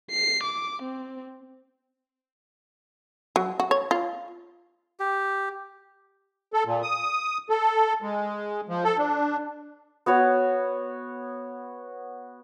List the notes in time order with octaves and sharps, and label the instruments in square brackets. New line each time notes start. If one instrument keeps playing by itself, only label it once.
[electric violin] C7
D6
C4
[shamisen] F#3
F#4
C#5
F4
[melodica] G4
[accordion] A4
A#2
D#6
A4
G#3
F3
A4
D4
[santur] B3 F#4 C#5